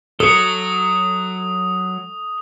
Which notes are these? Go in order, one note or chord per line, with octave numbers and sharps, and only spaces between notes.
F#3 A4 C#6 D#6